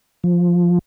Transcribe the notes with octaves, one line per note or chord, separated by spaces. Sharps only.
F3